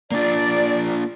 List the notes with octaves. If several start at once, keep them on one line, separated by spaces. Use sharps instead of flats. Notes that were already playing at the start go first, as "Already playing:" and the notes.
A#3 D4 F4 D5